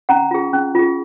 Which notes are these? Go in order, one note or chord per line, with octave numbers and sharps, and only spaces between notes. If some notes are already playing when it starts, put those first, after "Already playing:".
C#4 F#5 A#5
F4 G#4
C#4
F4 G#4